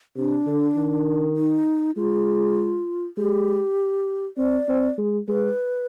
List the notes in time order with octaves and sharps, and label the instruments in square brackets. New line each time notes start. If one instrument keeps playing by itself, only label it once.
[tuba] C3 [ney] D4
[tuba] D3
D#3
[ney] D#4
[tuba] G#3 [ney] F4
[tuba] G#3 [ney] G4
[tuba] C4 [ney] D5
[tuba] C4
G#3
[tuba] G#3 [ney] B4